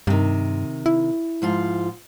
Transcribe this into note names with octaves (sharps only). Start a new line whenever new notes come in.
G2 C3 D#3
E4
G#2 F3 F4